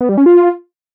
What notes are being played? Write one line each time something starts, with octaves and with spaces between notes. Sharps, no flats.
B3
G3
C#4
F4